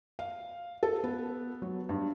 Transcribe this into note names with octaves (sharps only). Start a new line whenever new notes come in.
F5
A4
B3
F#3
G2